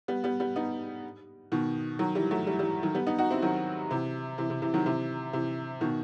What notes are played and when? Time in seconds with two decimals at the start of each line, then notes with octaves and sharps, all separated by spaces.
0.08 G3 B3
0.24 G3 B3
0.40 G3 B3
0.56 B3 D#4
1.52 B2 D#3
1.99 D#3 F#3
2.15 E3 G3
2.31 F#3 A3
2.47 E3 G3
2.59 E3 G3
2.83 D#3 F#3
2.95 G3 B3
3.06 B3 D#4
3.18 D#4 F#4
3.31 C4 E4
3.42 D#3 F#3
3.90 C3 E3
4.38 C3 E3
4.50 C3
4.62 C3 E3
4.74 D#3 F#3
4.86 C3 E3
5.33 C3 E3
5.81 B2 D#3